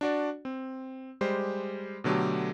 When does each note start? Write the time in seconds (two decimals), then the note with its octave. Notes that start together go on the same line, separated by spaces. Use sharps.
0.01 D4 F#4 D5
0.45 C4
1.21 G3 G#3 G4 C5
2.04 B2 D3 F#3 A3 G4